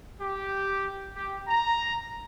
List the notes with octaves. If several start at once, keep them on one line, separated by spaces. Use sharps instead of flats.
G4
G4
A#5